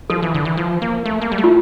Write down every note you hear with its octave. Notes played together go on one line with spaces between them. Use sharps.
F3 A4
E3
D3
E3
F3
A#3
A3
A#3
G3
A3
F4